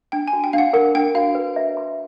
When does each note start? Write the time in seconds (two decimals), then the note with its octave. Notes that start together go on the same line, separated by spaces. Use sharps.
0.12 D4 G5
0.28 G#5
0.33 F#4
0.44 G5
0.53 D4 F5 F#5
0.73 A#4 F#5
0.95 D4 G5
1.15 F#4 F5
1.35 B4
1.56 E5
1.77 C6